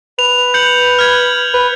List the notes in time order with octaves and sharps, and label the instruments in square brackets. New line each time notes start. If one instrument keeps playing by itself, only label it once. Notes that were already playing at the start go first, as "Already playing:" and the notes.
[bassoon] B4 [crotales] F7
[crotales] G6 C#7 F#7
F6 G#6
[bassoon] B4